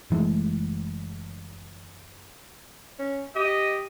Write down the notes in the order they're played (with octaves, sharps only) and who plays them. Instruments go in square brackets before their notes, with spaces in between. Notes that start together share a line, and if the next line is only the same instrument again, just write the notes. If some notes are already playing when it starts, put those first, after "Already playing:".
[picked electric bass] F#1 E3 G#3 A3
[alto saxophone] C#4
[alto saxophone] G4 [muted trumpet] D#5